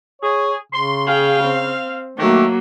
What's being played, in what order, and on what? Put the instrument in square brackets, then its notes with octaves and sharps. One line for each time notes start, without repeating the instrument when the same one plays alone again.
[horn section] G#4 [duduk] C#5
[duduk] C#3 [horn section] C6
[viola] G#4 G5 [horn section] F5
[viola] C4
[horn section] D#3 F#4 G4 [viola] F#3 A#3 [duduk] A3